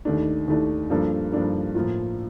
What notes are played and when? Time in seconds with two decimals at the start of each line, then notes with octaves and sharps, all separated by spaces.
0.05 D#2 D#3 A3 D4
0.48 D#2 D#3 A3 D4
0.90 G2 F3 A#3 D4 A4
1.32 G2 F3 A#3 D4 A4
1.75 A2 F3 A#3 F4